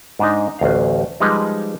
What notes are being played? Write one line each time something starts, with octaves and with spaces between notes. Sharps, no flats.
G#2 D4 D#4
A1 D2 F5
F3 G3 G#3 D#4 B4